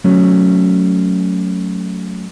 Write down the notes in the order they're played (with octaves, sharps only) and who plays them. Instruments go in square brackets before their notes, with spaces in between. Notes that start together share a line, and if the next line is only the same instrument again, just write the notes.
[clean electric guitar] F#3 A3 C#4